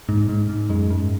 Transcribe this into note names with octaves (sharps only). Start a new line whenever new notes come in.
G#2
G#2
G#2
F#2 G#3
F#2